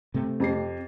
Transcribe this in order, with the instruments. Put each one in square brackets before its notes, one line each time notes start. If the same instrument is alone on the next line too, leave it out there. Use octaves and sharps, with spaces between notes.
[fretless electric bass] C3 A3 C4
[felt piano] F2 G4 C7